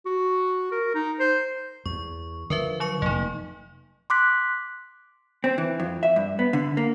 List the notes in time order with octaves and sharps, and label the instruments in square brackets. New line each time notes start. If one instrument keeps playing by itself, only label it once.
[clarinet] F#4
A#4
D#4
C5
[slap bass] E2 [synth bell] C#6
[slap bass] D3 D#3 F3 [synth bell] A#4 B4 E5
[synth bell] F#3 C#6 C#7
[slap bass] F1 F2 [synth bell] A#3 D#4
[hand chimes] C6 D6 F#6 B6
[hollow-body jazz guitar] C4
E3
F2
E5
G2
B3
D3
A#3